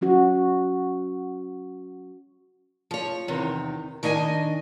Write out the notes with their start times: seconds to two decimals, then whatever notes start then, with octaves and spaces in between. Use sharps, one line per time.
0.01 F#3 C#4 F#4
2.91 F3 C#5
3.28 E2 C3 D#3
4.03 D#3 D4 D#5 F5 G#5